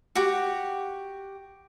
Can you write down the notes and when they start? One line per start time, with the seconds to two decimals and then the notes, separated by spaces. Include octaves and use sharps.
0.15 F#4 G4